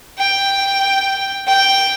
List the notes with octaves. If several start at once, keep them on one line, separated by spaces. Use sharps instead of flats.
G5
G5